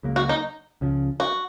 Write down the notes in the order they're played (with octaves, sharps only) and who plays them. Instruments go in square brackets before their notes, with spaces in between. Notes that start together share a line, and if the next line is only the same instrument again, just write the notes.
[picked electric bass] C#2 C#3 F#3 A#3
[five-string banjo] F#4
D#4
[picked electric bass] C#2 C#3 F3
[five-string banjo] F#4